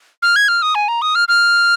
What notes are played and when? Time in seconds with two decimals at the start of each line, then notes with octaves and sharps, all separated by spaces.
0.22 F6
0.36 G#6
0.48 F6
0.62 D#6
0.75 G#5
0.88 A#5
1.02 D#6
1.15 F6
1.28 F6